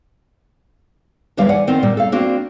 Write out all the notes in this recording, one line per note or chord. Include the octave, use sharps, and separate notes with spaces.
D#2 D3 E3 G3 F5
D5 F#5 G#5
D#3 C4 F4 F#5
A#2 G3 A#4
A4 F5
A#3 C4 D4 F4 F#4